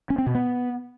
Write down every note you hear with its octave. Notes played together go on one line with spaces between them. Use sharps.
C#4
C4
B2
B3